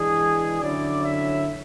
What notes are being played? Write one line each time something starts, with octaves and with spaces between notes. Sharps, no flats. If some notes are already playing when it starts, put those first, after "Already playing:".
Already playing: E3 G#3 D4 G#4
D3 F#3 C#4 E4 D5
E5